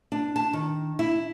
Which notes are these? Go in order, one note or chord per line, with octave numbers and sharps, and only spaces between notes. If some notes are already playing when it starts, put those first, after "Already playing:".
D4
A5
D#3
E4